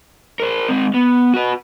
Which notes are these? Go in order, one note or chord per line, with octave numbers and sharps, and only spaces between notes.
A#4 C5
G#3 C4
B3
F#4 B4